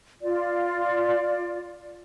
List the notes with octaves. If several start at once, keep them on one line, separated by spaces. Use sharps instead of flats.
F4 D5